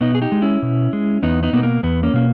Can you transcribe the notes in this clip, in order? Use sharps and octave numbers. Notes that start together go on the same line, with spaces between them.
B2 B3 D#4
G#4
D#4 G4
G#3
C#4 E4
B2
G#3
E2 B3 D#4
B3 D#4
B2 A#3 B3
A#3
E2 B3
A#3 C#4
B2 A#3